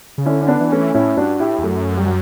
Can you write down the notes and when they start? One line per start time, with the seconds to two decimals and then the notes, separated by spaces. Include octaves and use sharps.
0.18 C#3
0.26 D3 C#4 E4
0.42 C#4
0.48 B3 D4
0.60 E3
0.72 A3 C#4
0.94 A2 C#4 E4
1.17 G2 D4 F#4
1.40 A2 E4 G4
1.59 E2
1.63 F#2 F#3 A3
1.97 G3
2.06 F#3